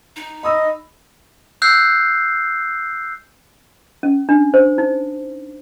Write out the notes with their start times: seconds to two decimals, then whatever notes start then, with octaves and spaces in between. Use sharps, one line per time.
0.16 D#4
0.43 D#5 B5 D#6 E6
1.62 E6 F#6 G6 C7
4.03 C#4
4.29 D4
4.54 C5
4.78 D#4